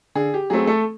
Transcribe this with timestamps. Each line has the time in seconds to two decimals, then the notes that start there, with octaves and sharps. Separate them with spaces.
0.15 D3 G#4
0.34 G4
0.50 F#3 A3 C4 G#4
0.67 A3 A4